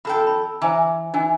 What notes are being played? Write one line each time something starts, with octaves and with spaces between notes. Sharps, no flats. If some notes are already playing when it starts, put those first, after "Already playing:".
F2 A4 G5 B5
B5
E3 C5 G#5 A#5
E3 D#4 G#5